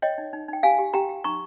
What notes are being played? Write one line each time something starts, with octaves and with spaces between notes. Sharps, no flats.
C#5 D#5 G5
D#4
D#4
D#4 G5
G4 F5 G#5
G4
G4 G5 A#5
G4
D#4 A#5 C#6